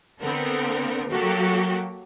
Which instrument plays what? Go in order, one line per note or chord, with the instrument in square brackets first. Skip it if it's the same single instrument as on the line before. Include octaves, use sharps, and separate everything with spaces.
[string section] D3 B3 C4 A4 A#4
F#3 A#3 F#4 G4 A4